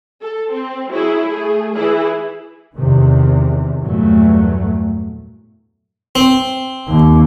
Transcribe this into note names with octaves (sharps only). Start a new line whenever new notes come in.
A4
C4
F#3 E4 G#4
A3 G#4
E3 E4 G#4
E2 C3 D#3
E2 G2 A#2 F#3 A3
C4
D#2